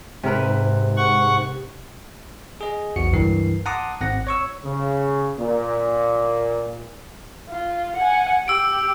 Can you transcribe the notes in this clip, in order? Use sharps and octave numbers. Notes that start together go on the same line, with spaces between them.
G#2 C3 A#4 B4
F#5 C#6
G#4 D#5
A#1 E2 F#4 C#7
C#2 G2 E3 A#4 C7
F#5 A5 A#5 C6 D6 D#6
G#1 C4 F#5 A#6
C#5 C#6 E6
C#3
A#2
F4
F#5 G#5
G4 E6 D7